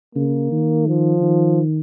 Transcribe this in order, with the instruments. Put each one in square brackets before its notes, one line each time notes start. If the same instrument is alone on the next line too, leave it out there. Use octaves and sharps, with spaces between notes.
[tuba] C#3 [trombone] A#3
[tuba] D#3
[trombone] F3
[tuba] D#3